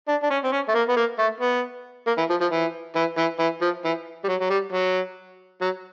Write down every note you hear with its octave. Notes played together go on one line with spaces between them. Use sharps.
D4
D4
C#4
C4
C#4
A3
A#3
B3
A#3
A3
B3
A#3
E3
F3
F3
E3
E3
E3
E3
F3
E3
G3
F#3
F#3
G3
F#3
F#3